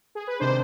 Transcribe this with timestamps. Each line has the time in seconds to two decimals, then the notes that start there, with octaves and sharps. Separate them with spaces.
0.15 G#4
0.27 B4
0.40 C3 D#3 G#3 D4 C5